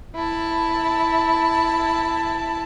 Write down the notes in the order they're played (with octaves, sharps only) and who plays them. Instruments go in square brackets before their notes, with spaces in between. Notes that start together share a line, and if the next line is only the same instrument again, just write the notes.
[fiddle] E4 A5